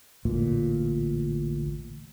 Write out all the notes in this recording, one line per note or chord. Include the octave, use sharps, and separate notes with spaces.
A1 D2 A#2